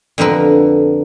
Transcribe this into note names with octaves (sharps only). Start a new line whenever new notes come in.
F2 D3 B3 A#4 B4